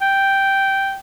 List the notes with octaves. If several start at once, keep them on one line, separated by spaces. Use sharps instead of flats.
G5